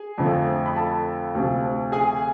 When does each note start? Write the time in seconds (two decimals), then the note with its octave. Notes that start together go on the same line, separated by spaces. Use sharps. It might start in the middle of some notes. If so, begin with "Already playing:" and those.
Already playing: G#4 G#5
0.18 F2 D3 F3 A3
0.66 B5
0.76 A4 A5
1.35 D2 C3 F3
1.92 G#4 G#5